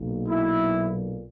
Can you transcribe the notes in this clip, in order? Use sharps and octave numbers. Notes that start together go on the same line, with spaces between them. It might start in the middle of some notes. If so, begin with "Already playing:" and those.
Already playing: B1 A#2
E4